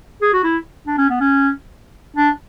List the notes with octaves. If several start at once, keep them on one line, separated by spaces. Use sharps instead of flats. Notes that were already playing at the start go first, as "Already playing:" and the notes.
G#4
F#4
E4
D4
C#4
B3
C#4
D4